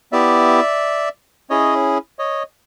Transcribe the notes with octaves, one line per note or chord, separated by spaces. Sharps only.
B3 E4 G4 D5 E5
C#4 E4 G#4 C#5 D#5
C#5 D#5